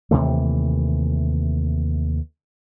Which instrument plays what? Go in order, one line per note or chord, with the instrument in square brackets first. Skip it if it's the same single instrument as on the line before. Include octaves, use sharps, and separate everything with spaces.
[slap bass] D#2 C3 E3 A3